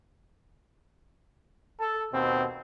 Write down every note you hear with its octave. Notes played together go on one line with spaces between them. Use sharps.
A4
D#2 B2 C4